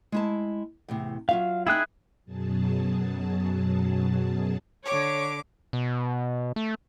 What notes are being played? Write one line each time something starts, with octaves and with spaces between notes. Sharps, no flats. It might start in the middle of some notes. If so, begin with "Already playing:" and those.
G#3 E4 A5
E2 A2 C3
F#3 F4 E5 F5
D#4 E4 G#4 G5 F#6
F#2 B2 F#3 G#4 A5
D3 C#5 D6
B2
A3